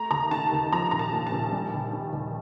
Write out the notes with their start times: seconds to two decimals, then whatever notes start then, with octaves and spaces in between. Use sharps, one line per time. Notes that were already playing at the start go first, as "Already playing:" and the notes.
Already playing: A3 A#5
0.11 D#2 A#5
0.31 D#3 A5
0.52 D#2
0.73 F3 A#5
0.91 A#1 A#5
0.99 A5
1.13 A#2
1.27 A5
1.32 A#1
1.52 G3
1.74 D#2
1.93 D#3
2.13 D#2